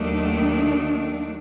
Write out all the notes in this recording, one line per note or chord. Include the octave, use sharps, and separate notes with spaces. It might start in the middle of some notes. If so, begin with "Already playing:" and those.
Already playing: D#2 D#3 F#3 A3 D4